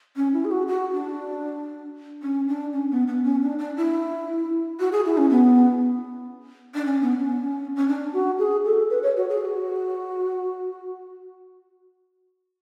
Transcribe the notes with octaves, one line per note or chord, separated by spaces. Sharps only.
C#4
E4
G#4
F#4
F#4
D4
C#4
D4
C#4
B3
B3
C#4
D4
D4
E4
F#4
G#4
E4
C#4
B3
D4
C#4
B3
C#4
C#4
D4
F#4
G#4
A4
B4
C#5
F#4
G#4
G#4
F#4